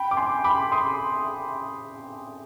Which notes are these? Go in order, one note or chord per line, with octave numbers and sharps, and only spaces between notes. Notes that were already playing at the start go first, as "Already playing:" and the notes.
Already playing: G5 B5
D6
G#5 C6
B5 D6
C6 D#6